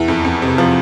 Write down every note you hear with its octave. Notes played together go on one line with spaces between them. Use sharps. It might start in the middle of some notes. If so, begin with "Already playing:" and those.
Already playing: E2 E4
F2
F2
C3
F3